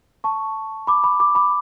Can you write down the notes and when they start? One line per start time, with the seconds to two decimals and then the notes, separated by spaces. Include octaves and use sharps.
0.24 A5 C#6
0.87 B5 D6
1.04 B5 D6
1.20 B5 D6
1.35 B5 D6